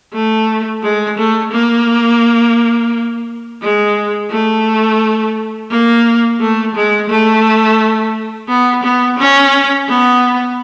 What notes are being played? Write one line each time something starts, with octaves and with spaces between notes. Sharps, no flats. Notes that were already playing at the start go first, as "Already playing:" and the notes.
A3
G#3
A3
A#3
G#3
A3
A#3
A3
G#3
A3
B3
B3
C#4
B3